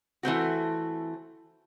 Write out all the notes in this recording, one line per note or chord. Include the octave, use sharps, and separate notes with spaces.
E3 A3 C4 F#4